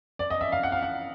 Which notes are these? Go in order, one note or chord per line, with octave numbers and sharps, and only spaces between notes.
D5
D#5
E5
F5
F#5
F5
F#5